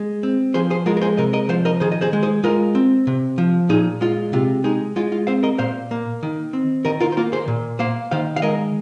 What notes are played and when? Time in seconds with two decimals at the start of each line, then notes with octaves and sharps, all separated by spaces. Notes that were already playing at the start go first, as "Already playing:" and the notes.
Already playing: G#3
0.23 C4
0.54 F3 G#4 C5
0.70 G#4 C5
0.86 G#3 F4 A#4
0.97 A#4
1.01 G#4 C5
1.17 C3 A#4 D#5
1.33 A#4 D#5
1.49 F3 C5 F5
1.65 A#4 D#5
1.80 D#3 G#4 C5
1.92 D#5
2.01 G#4 C5
2.13 G#3
2.23 G#4 C5
2.44 G#3 F4 A#4
2.75 C4
3.07 C3
3.38 F3
3.69 A#2 D#4 G#4
4.01 G#3 F4
4.33 C3 F4
4.64 G#3 D#4 G#4
4.96 G#3 F4
5.12 F4
5.27 C4 C5 F5
5.43 A#4 D#5
5.58 A#2 C5 F5
5.91 A#3
6.23 D#3
6.53 C4
6.85 D#3 A#4 D#5
7.00 F4 A#4
7.12 C5
7.17 A#3 F4 A#4
7.32 G#4 C5
7.48 A#2
7.79 A#3 C5 F5
8.11 D#3 C5 F5
8.36 F5
8.42 G#3 A#4 D#5